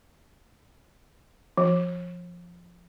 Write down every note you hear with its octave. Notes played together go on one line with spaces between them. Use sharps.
F3